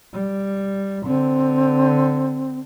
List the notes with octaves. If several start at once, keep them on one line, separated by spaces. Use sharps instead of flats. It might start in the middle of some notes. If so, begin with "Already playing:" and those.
G3
D3 C4